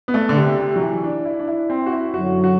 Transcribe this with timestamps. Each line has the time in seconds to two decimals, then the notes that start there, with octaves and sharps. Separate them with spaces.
0.08 B3
0.14 A3
0.29 D3
0.37 C3
0.59 C3
0.76 F#3
0.81 E3
1.04 D4
1.25 E4
1.39 D4
1.48 E4
1.70 C4
1.86 F#4
1.92 E4
2.14 F#2 D3 F#3 F#4
2.44 F#4